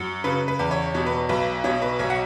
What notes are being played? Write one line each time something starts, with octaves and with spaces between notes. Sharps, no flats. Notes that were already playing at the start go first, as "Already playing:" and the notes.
Already playing: F#2
C#3 B4
B4
E2
C#5
B2 C#5
B4
B1 B4
B2 C#5
B4
B1 C#5
F#5